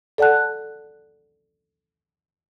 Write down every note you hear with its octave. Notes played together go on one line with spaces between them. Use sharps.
A4 D5 F#5 A5 F#6